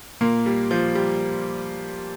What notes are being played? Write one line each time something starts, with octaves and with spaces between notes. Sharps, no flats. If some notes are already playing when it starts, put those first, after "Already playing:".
A#2 A#3
G3
F3
G3